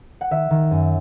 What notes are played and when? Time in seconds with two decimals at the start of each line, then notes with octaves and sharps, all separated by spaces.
0.21 F#5
0.31 D#3 E5
0.50 D#3
0.71 F#2